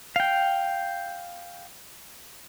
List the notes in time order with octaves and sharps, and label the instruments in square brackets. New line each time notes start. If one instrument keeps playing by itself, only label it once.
[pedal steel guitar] F5 G5